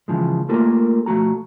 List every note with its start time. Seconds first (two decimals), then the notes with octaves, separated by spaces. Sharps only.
0.08 C#3 E3 F3 G#3
0.49 A3 A#3 F4 G4 A4 A#4
1.06 B1 F3 A3 F#4 A#5